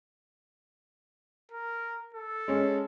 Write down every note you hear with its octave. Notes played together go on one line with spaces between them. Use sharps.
A#4
A4
G#3 C#4